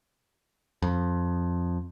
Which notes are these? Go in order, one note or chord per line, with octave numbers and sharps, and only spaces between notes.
F2